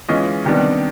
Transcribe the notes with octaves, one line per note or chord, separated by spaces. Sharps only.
E3 G#3 C#4 F4 D#5
C3 D#3 G3 B3 D4